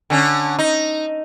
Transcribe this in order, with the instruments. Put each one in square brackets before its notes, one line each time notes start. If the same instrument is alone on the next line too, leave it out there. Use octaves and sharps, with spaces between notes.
[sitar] D3 C#4
D#4